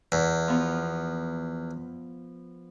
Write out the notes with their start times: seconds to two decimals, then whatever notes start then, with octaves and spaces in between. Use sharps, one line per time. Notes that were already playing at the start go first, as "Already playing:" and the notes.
0.12 E2
0.48 F3 B3 F4